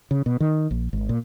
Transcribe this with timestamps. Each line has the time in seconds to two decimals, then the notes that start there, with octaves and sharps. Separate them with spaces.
0.11 C#3
0.26 B2
0.40 D#3
0.71 A#1
0.93 G#1
1.09 A#2